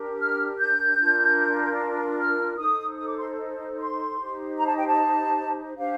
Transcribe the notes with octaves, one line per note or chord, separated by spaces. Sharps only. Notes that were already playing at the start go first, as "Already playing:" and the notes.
Already playing: D4 G4 A#4
F6
G6
D4 F4 A#4
F6
D#4 A4 C5 D#6
D#6
D6
C6
C6
D#4 G4 C5
A#5
A5
G5
A5
D4 G4 C5 F5